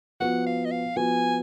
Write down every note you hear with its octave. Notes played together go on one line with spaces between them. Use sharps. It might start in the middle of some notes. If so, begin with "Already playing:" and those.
F3 B3 F#4 F#5
F5
D#5
F5
F3 B3 F#4 G#5